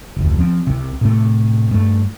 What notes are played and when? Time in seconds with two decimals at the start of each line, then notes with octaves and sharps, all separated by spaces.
0.16 F1 D2
0.39 F3 C4
0.67 C2 C3
1.01 A2 C3 A3
1.71 G2 A3